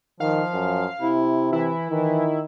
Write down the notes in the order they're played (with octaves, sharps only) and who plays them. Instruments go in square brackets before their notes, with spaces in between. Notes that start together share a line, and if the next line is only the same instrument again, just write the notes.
[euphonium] D#3 [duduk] F3 [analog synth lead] F5
[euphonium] F#2
[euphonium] C3 [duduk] E4
[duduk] E3 [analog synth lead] E4
[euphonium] D#3 [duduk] E3